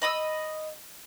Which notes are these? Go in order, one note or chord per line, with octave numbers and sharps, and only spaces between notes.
D#5 B5 D#6 E6